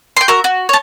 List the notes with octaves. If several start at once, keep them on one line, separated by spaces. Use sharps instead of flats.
G5 C6
F#4 A#4 E5 A#5
F#4
C#5 A5